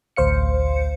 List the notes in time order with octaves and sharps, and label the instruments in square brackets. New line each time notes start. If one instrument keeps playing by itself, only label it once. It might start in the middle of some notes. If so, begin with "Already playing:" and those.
[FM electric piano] A1 D2 C5 F5 C#7